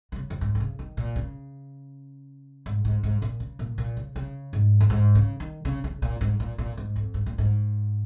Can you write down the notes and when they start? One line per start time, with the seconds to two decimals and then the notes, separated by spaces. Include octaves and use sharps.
0.12 D#3
0.16 C#3
0.30 F2
0.41 G#2
0.55 D#3
0.60 C#3
0.79 D#3
0.97 A#2
1.16 C#3
2.66 G#2
2.85 G#2
3.03 G#2
3.22 A#2
3.40 C#3
3.59 A#2
3.78 A#2
3.97 C#3
4.16 C#3
4.53 G#2
4.80 F2
4.90 G#2
5.15 C#3
5.40 D#3
5.65 C#3
5.84 C#3
6.02 A#2
6.21 G#2
6.40 A#2
6.58 A#2
6.77 G#2
6.96 F2
7.14 G#2
7.26 A#2
7.38 G#2